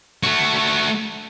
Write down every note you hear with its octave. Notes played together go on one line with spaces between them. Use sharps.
A3 F#4